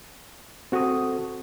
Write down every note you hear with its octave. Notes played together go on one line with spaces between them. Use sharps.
C4 F#4 A4 C#6 D#6